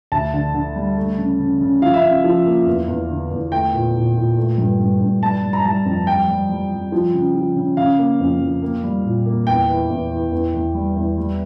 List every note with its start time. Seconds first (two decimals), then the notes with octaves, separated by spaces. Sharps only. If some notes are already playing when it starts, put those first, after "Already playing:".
0.12 D2 A5
0.33 D3
0.54 D3
0.76 G3
0.96 A3
1.18 C#3
1.39 C#3
1.61 C#3
1.82 F3 F5
1.94 E5
2.04 C#3 F5
2.24 F3
2.46 A#3
2.66 E2
2.88 E2
3.10 D3
3.31 E2
3.52 A3 G5
3.73 A#2
3.95 A#2
4.16 A#2
4.37 A3
4.58 G2
4.79 G2
5.00 G2
5.22 G3 A5
5.43 G3
5.53 A#5
5.65 G3 A5
5.85 F2
6.07 G3 G5
6.28 G3
6.49 G3
6.71 G3
6.92 F3
7.14 C#3
7.35 F3
7.56 C#3
7.77 C#3 F5
7.98 A#3
8.20 F2
8.40 F2
8.62 A#3
8.83 G3
9.04 A#2
9.26 A#3
9.47 E2 G5
9.68 E3
9.90 E2
10.11 E3
10.32 E2
10.54 E2
10.75 G3
10.97 E2
11.17 G3